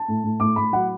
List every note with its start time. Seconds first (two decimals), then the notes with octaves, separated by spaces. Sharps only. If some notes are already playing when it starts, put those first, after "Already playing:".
Already playing: A5
0.08 A2
0.24 A2
0.40 A2 D6
0.56 A2 B5
0.73 F#3 F#5